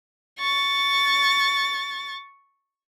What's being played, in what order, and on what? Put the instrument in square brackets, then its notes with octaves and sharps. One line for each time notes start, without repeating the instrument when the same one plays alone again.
[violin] C#6 A6